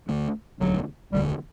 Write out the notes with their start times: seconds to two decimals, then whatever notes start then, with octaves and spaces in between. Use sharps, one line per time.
0.09 D2 D3 A3
0.60 E1 D2 D3 F#3
1.12 E1 D2 D3 G3